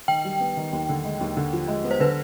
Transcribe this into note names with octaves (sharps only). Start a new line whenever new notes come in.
D#3 G5
G3
B3
D#3
D#2
D3
G#3
D#2
D3
F3
G#3
B3
C5
D3 B4